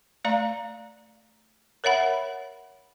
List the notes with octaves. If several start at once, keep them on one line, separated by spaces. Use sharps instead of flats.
A3 D5 F5 A#5
A#4 C#5 E5 F#5 B5